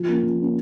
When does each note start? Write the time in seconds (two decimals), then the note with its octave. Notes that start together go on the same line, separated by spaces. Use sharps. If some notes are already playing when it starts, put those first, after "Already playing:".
Already playing: F3
0.08 A#3 C#4
0.23 F3
0.39 A#3 C#4